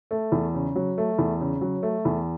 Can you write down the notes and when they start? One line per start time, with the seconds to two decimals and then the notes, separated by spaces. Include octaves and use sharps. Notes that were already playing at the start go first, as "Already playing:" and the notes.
0.11 A3
0.32 E2
0.55 C#3
0.76 F#3
0.98 A3
1.19 E2
1.41 C#3
1.61 F#3
1.83 A3
2.05 E2